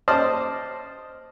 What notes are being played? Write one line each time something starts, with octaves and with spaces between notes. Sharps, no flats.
C5 D5 D#5 A5 D#6 F6